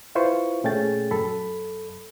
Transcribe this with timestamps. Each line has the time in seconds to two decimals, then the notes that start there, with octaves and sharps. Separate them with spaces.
0.15 E4 F4 B4 C5 C#6
0.64 A#2 A3 C#4 G#4 G5 A6
1.11 F#2 A4 B5